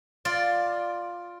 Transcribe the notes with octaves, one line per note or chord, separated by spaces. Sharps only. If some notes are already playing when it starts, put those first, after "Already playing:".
F4 D5